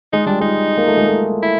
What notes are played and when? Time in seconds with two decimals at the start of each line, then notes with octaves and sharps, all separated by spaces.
0.13 G#3 D#4
0.26 G3 D4
0.41 G#3 D#4
0.78 A#3
0.87 A3
0.97 G#3
1.06 A3
1.43 E4